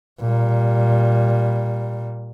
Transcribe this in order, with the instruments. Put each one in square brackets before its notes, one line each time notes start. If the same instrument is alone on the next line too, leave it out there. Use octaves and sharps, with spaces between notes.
[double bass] A#2 G3